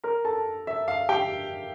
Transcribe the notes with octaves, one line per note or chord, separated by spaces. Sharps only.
A#4 A#5
A4 A5
E5
F5
G4 G5